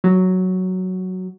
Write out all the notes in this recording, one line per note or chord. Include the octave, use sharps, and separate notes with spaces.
F#3